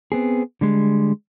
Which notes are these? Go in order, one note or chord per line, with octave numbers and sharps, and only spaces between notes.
B3 C4 G#4
D3 G3 G#3